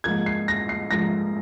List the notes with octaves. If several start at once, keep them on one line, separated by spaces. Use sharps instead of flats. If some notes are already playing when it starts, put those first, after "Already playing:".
G#2 F3 A#3 G#6
C7
A#6
C7
G#2 F3 A#3 A#6